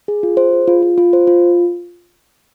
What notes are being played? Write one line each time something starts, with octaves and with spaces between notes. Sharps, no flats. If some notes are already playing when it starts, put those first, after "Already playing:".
G#4
F4
C5
G#4
F4
F4
F4
C5
F4